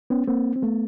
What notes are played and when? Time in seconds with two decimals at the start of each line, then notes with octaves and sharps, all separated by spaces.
0.10 B3 C#4
0.28 A#3 C4
0.56 C4
0.62 A3 B3